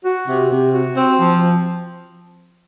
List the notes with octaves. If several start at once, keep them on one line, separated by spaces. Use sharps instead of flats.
F#4
C3
C3
F#4
C4
F3